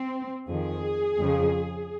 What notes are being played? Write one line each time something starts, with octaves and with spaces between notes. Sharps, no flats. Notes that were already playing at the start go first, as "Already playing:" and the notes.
Already playing: C4
F2 D#3 G#4
F2 C#3 F3